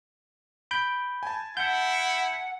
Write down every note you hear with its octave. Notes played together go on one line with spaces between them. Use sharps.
B5 G6 D7
G#5 A5
E4 F#5 G6